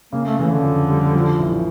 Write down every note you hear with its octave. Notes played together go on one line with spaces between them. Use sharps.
C#3 A#3
A3
C#3 E3
D3
F2
G3
F3
A1